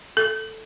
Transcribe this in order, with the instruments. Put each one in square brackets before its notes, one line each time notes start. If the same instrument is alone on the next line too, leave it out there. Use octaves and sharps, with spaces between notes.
[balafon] A4